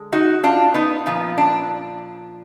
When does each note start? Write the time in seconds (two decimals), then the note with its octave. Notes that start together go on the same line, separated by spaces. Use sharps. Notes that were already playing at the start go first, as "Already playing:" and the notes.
Already playing: D3 G#3
0.12 D#4 F#4
0.43 D4 F4
0.74 B3 D#4
1.06 A#2 F3 B3
1.38 D4